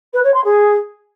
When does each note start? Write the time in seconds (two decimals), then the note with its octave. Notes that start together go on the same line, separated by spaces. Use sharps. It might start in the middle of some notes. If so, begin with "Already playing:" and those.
0.13 B4
0.23 C#5
0.33 C6
0.44 G#4